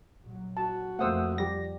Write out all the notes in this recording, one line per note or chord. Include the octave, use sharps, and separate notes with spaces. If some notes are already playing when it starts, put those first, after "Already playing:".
A#1 F#3
F#4 A5
F2 F3 A3 A#3 C5 F#5 D#6 E6
G3 G4 A#6